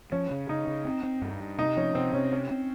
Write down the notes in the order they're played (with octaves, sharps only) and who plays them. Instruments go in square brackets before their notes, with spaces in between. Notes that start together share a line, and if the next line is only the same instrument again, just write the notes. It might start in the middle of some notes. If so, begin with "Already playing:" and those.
[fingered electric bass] F3 [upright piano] C#4
[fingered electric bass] C#3
[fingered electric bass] C#3 [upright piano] D#4
[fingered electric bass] C#3
C4
C4
G2
G2
[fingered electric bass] C3 [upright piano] D#4
[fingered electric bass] F3 [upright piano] C#4
[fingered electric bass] C3 [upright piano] C4
[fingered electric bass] C3 [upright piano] C#4
[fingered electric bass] C4 [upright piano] C#4
[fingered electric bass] C4